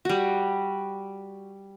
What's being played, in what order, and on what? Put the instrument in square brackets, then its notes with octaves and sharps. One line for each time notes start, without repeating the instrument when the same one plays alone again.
[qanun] G3 F#4